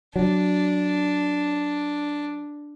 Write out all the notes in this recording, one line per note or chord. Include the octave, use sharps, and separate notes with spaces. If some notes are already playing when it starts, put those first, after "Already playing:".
F#3 D4